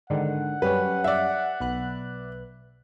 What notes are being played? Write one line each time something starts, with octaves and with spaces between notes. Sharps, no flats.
G#2 D3 D#3 F#5
F#2 G3 C#4 B4
D5 E5
B1 B4 F#6